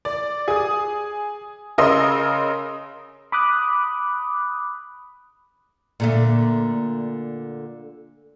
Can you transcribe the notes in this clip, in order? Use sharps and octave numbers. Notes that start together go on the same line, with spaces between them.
D5
G#4 D#6
C#3 A#4 D#5 C6 E6
B5 D6 D#6 F#6
A#2 D3 A3